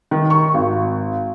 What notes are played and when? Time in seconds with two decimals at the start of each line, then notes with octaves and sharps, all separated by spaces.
0.11 D#3
0.30 C#6
0.54 G#1